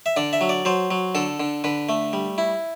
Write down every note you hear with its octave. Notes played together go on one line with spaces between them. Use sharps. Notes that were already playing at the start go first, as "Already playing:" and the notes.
E5
D3 D5
E5
F#3
D5
F#3 C5
F#3
D3 A4
D3
D3 B4
A3
G3
E4